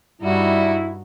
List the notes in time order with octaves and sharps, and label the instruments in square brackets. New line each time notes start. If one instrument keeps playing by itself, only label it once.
[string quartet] G2 D#4 F#4 [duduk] G3 [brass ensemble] E4